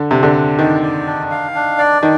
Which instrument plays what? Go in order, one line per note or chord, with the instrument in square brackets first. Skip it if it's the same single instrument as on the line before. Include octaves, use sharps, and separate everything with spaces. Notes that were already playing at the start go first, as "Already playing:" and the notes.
Already playing: [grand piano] D3
[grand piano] C3 [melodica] D4
[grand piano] D3
[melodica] D4
[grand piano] D#3 [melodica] D5
[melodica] D5
D4
F5
D4
D5
[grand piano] D#3 [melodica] D4